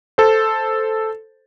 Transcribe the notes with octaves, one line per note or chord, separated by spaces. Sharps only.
A4 C5